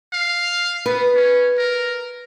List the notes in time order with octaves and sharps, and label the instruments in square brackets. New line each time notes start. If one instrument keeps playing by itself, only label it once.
[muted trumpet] F5
[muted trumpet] B3 [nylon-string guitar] B4
[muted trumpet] C#4
A#4